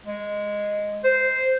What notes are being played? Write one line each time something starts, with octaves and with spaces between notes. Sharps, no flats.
G#3
C5